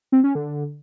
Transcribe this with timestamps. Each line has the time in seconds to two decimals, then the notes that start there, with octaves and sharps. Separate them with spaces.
0.12 C4
0.24 C#4
0.35 D3